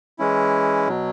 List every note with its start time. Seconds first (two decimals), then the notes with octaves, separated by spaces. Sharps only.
0.19 E3 G#3 C#4 E4
0.87 B2 F#3